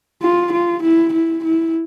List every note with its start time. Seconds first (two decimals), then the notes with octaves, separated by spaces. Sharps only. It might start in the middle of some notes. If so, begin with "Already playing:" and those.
0.22 F4
0.53 F4
0.83 E4
1.13 E4
1.44 E4